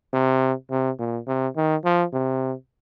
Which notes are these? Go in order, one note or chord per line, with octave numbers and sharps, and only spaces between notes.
C3
C3
A#2
C3
D#3
F3
C3